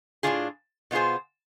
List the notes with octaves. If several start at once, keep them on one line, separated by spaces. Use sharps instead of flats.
A2 G#3 D4 F4 G#4
B2 B3 F4 G#4 C5